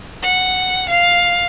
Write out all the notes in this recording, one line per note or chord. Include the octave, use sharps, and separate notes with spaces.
F#5
F5